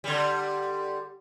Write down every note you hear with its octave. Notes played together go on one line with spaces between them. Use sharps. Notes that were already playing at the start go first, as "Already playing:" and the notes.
D3 G3